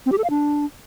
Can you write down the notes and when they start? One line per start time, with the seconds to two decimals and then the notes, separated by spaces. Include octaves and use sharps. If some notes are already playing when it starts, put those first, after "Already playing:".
0.06 C4
0.12 G4
0.18 A4
0.24 F5
0.30 D4